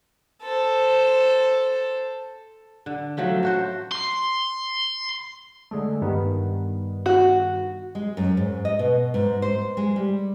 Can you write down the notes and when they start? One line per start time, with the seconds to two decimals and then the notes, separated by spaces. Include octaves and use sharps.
0.43 A4 C5
2.86 D3
3.17 F3 F#3 A3 C#4
3.43 A3 F#4 C5
3.91 C6
5.71 D3 G#3 A3
6.02 G2 D#3 B3
7.06 F#4
7.95 G#3
8.17 F#2
8.37 G#2
8.65 D#5
8.79 B2
9.14 G#2
9.42 C5
9.77 G#3
9.96 G3